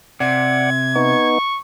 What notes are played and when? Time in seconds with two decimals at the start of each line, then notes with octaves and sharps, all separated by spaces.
0.20 C3 D5 F#5 G#6
0.96 B3 D#4 C#6